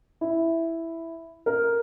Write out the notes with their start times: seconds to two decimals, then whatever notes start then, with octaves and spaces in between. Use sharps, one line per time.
0.21 E4
1.46 A#4